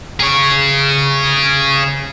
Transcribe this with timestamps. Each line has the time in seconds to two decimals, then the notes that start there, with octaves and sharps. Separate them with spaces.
0.20 G#4 C#5